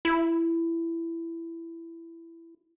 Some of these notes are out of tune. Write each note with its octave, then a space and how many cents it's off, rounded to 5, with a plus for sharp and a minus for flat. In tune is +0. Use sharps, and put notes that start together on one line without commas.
E4 +15